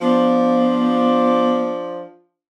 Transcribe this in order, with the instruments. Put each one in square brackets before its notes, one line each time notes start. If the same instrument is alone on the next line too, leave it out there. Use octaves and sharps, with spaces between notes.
[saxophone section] F3 D4 [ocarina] B3